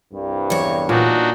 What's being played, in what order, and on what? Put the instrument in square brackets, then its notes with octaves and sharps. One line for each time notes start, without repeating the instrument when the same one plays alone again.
[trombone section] C2 G2
[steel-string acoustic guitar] E2 C#5
[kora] A#2 [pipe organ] D4 D#4 F#4